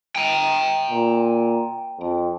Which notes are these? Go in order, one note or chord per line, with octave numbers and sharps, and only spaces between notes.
G5 A#5
A#2
F2